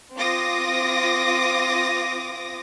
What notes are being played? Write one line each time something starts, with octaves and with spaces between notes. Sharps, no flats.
C4 F4 D6 D#6 A#6